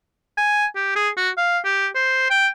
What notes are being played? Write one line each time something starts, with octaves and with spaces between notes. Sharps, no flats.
G#5
G4
G#4
F#4
F5
G4
C5
G5